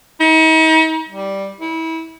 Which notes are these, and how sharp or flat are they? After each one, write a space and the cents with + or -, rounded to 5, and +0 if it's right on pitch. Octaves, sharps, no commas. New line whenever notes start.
D#4 +45
G3 -5
E4 -25